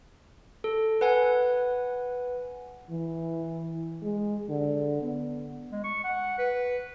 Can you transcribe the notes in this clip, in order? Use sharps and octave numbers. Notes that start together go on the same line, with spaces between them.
A4
B4 F#5 G#5
E3
G#3
D3
B3
G#3
C#6
F#5
B4